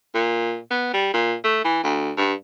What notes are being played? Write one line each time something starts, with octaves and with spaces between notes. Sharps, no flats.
A#2
B3
G3
A#2
A3
E3
D2
G2